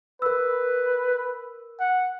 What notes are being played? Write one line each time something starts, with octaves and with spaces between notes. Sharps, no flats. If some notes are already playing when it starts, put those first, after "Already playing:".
A#4 B4 E6
F#5